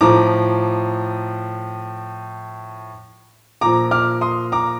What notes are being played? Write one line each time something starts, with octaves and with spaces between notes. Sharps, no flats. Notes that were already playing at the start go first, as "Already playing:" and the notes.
A2 F3 A#5 D6
A#2 F3 A#5 D6
D6 F6
C6 D#6
A#5 D6